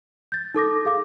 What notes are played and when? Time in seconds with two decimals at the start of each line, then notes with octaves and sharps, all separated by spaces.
0.32 G6 A6
0.54 D#4 A4 D6 A#6
0.85 G#4 F5 D6